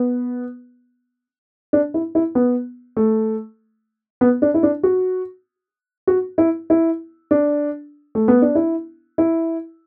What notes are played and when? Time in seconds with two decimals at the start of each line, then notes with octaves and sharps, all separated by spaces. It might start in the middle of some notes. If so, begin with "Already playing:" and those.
Already playing: B3
1.73 D4
1.94 E4
2.15 E4
2.35 B3
2.97 A3
4.21 B3
4.42 D4
4.54 E4
4.63 D4
4.83 F#4
6.07 F#4
6.38 E4
6.70 E4
7.31 D4
8.15 A3
8.28 B3
8.42 D4
8.55 E4
9.18 E4